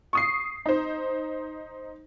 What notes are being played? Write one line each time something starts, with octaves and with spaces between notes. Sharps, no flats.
C#6 D#6 C7
D#4 C5